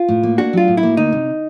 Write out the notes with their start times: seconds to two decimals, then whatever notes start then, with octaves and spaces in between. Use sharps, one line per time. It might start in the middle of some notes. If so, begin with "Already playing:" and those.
Already playing: F4
0.08 A2
0.23 A#3
0.38 D4 F#4
0.53 F#3 F4
0.68 A2
0.77 E4
0.83 A#3
0.97 D2 D#4
1.12 C3